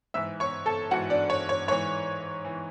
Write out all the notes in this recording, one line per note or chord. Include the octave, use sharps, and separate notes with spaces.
G#2 E3 E5 E6
C#5 C#6
A4 A5
G#2 E3 F#4 F#5
D4 D5
C#5
C#5
G#2 E3 C#5
E3